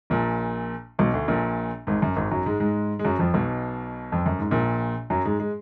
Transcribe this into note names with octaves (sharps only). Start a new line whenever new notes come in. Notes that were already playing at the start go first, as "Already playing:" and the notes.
A#1 A#2
B1 B2
D2 D3
A#1 A#2
G#1 G#2
F#2
G#1 G#2
F#2 F#3
G#2 G#3
G#2 G#3
G#3
F#2 F#3
F2 F3
B1 B2
F2
F#2
G#2
A#1 A#2
F#2 F#3
G#2 G#3
G#3